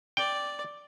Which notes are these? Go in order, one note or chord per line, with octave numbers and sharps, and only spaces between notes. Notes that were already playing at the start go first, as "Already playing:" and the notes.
D5 G5